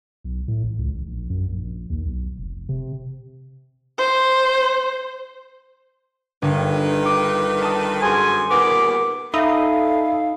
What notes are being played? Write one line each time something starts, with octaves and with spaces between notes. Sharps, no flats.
B1
A2
A1
C#2
A1
A#1
F#2
A#1
D#2
B1
F1
C3
C5
G1 D#3 B4
D6
A5 D#6
F#2 G#4 C5 G#5 C6
D#2 A#2 B3 A#4 D6
D#4 A4 E5 F5 B5 D#6